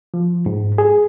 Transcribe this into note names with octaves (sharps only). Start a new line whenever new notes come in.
F3
G#2
G#4